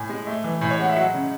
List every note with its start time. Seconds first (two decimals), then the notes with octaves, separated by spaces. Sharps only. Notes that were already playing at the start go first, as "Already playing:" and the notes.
Already playing: A2 G#5
0.09 G#3
0.27 A3
0.44 E3
0.61 A2 G#5
0.70 C#5
0.79 G#3 F#5
0.89 E5
0.96 F#3 F#5
1.14 C#3